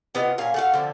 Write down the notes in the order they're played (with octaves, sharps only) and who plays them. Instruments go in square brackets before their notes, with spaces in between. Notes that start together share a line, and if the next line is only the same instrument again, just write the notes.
[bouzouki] C3 B3 F4 D#5
A#2 C#4 F5 G#5
A3 F#4 F5
D3 F3 C4